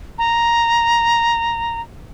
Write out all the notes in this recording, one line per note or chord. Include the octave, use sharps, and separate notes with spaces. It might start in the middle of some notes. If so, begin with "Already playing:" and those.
A#5